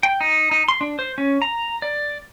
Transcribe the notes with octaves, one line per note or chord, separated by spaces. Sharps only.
G5
D#4
D#4
C6
D4
C5
C#4
A#5
D5